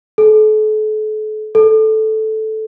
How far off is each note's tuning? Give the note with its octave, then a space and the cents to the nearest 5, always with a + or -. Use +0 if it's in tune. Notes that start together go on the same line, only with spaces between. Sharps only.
A4 -40
A4 -10